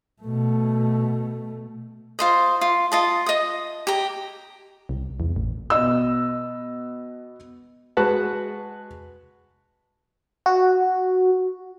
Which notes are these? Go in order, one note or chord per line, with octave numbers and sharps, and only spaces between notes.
B2 A3
F4 C5 D#5
F4
F4 D#5 A5
D#5 D#6
G4 A#5
C2
E2
A1
B2 B3 D#5 E6
G#3 F#4 B4 F#5 A5
F#4